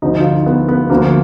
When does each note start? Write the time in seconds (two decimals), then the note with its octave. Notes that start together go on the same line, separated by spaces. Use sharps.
0.02 D2 D3 F3 D#4
0.20 F4
0.24 D#4
0.46 B3
0.68 B3
0.90 D2 D3 F3 A#3